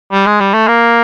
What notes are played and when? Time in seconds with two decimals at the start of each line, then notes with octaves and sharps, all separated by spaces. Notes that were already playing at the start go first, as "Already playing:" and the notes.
0.12 G3
0.26 G#3
0.40 G3
0.54 A3
0.68 A#3